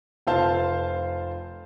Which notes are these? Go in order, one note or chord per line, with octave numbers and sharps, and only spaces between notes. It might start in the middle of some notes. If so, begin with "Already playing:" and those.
F1 F4 C5 F5 A5